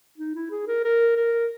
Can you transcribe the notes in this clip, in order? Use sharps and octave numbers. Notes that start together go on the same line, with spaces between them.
D#4
E4
G#4
A#4
A#4
A#4